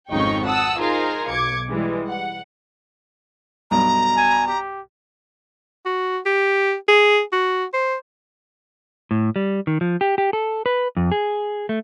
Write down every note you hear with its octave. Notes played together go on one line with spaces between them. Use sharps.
G#1 F2 C#3 D#4 G5 C#6
F#5 A5 D#6 E6
D#4 F4 G#4 A#4 C5
B1 D6 G#6 C#7
E3 G3 G#3
F#5
B1 G2 B2 A#5
G#5
G4
F#4
G4
G#4
F#4
C5
A2
G3
D#3
F3
G4
G4
A4
B4
F2
G#4
A3